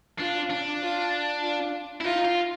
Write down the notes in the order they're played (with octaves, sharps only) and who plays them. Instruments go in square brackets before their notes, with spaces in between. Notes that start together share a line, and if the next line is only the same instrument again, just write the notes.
[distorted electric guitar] D4 [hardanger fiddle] F4
[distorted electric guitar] D4
[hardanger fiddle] F4
F4
[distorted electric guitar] E4
[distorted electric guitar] D#4 [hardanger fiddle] F4
[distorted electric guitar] F4